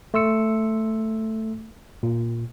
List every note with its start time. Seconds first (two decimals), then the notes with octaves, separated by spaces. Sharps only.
0.14 A3 C6 E6 C#7
2.03 A#2